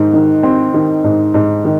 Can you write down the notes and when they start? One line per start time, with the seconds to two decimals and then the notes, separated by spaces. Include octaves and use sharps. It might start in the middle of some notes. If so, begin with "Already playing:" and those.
Already playing: G#2 D#3
0.13 D#3
0.43 C4
0.74 D#3
1.04 G#2
1.34 G#2
1.65 D#3